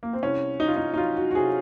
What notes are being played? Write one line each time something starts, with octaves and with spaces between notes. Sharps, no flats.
A#3
C4
C2 C#4
C2 D#4
F4
D#4
D#4
F#3 F4
F#4
F#4
C3 G#4